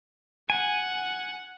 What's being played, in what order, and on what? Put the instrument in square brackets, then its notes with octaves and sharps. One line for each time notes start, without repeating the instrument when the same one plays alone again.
[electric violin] F#5 [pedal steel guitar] G#5